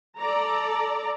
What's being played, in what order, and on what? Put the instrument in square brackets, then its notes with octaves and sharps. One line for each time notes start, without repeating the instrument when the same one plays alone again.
[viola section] A4 D5 A#5